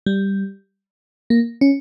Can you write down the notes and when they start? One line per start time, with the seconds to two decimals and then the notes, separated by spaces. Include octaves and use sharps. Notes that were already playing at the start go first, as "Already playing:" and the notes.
0.06 G3
1.30 A#3
1.61 C#4